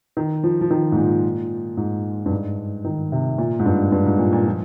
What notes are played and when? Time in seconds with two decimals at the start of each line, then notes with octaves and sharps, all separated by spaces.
0.17 D#3
0.43 F3
0.61 F3
0.70 D#3
0.92 G#2
0.97 A#2
1.77 G#2
2.26 G2
2.31 G#2
2.84 D#3
3.12 C3
3.38 A#2
3.59 G#2
3.66 G2
3.92 G2
4.06 G#2
4.19 A#2
4.32 A#2
4.45 F3